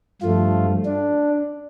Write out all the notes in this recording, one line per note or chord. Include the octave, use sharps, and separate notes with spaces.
G2 F3 A3 F4
D4